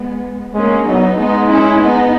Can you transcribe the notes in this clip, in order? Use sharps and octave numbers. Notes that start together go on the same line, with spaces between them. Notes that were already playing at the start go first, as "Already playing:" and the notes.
Already playing: G#3 B3
G#3 A#3 C#4
F#3 B3 D#4
G#3 B3 D#4
C#4 E4
B3 D#4